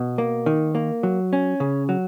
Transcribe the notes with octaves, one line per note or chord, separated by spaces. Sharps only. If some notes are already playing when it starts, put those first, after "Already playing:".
Already playing: B2
A#3
D#3
A#3
F#3
C#4
C#3
F#3